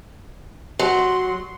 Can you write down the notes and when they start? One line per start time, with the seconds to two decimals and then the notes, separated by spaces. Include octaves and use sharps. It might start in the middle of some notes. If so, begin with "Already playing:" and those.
0.79 F#3 C6